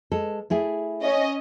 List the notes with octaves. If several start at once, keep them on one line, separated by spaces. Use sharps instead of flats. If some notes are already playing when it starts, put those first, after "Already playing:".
G#3 A4
A3 E4 G#4
C#4 D#5